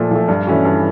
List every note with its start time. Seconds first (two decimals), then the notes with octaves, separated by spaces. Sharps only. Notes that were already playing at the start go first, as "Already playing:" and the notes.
Already playing: A#2 F3 A3
0.11 F3 A3
0.28 G2
0.47 E3 A3 C#4 F#4
0.65 G2